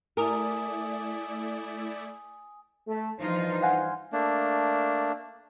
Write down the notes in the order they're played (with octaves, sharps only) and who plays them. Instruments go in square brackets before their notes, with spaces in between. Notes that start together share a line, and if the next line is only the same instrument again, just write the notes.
[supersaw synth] A3 E4 D5 [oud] A#4 [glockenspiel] G#5 D#6
[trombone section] A3
[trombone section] G2 E3 C5 [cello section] F3 D#4 F4
[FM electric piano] F5 F#5 G#5
[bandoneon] A3 A#3 D4